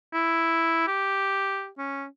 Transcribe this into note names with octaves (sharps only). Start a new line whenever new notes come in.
E4
G4
C#4